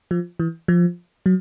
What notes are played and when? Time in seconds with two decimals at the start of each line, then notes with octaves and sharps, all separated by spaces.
0.11 F3
0.39 E3
0.68 F3
1.26 F#3